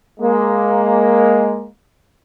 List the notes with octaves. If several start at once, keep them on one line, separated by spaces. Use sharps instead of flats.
G#3 A#3